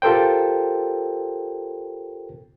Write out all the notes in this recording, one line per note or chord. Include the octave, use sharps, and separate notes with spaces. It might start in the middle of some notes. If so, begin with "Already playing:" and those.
F4 G4 A4 A#4 C5 G5